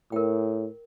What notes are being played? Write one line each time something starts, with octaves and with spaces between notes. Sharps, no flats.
A2 A#4 G5